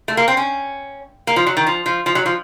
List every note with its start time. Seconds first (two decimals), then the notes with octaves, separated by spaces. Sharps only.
0.08 A3
0.17 A#3
0.28 C4
0.37 C#4
1.27 A#3
1.36 F3
1.47 F#3
1.57 D#3
1.67 F3
1.86 F3
2.06 F3
2.15 F#3
2.26 F3